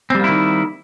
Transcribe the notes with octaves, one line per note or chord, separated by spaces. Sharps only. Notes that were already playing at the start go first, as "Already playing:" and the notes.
D#3 G3 A#3 C4 E4